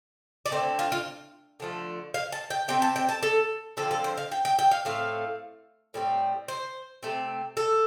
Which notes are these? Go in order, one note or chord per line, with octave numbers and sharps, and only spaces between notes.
D5
D3 A3 C4 C5
F4
F4
D3 F3 A3
F5
A5
G5
C3 A3 C4 G5
A5
G5
A5
A4
D3 F3 C4 A4
A4
C5
F5
G5
G5
G5
F5
A2 A3 C4 F5
A2 G3 C4
C5
C3 A3 C4
A4